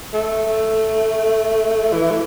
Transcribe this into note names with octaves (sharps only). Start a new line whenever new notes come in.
A3
E3
A3